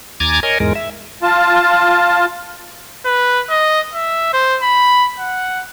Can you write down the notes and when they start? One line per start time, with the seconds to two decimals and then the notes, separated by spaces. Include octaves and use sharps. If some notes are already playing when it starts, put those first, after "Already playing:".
0.20 D#2 G#5 A#5 D6 G#6 A6
0.43 A#4 C#5 D#5 G#5
0.60 E2 G#2 G#3 A#4
0.75 E5
1.23 F4 A5
3.06 B4
3.50 D#5
3.94 E5
4.34 C5
4.62 B5
5.19 F#5